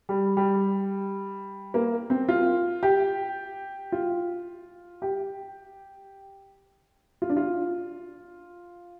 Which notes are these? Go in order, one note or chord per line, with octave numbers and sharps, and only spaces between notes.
G3
G3
A#3
C4
F4
G4
F4
G4
F4
D4
F4